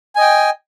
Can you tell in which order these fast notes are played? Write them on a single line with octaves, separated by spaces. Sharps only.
G#5 D#5 G5